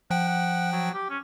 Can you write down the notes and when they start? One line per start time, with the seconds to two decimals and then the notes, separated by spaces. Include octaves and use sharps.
0.10 F3 F#5 G5
0.28 F#5
0.72 F#3
0.94 G4
1.10 C#4